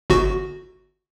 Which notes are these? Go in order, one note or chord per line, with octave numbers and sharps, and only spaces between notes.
G1 F#4